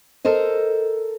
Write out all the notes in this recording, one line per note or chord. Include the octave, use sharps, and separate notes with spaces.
A4 A#4 C5 D#5